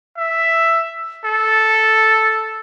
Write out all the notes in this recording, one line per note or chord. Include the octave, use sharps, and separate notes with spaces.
E5
A4